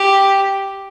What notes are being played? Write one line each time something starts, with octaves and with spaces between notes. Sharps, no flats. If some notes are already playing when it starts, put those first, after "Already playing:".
Already playing: G4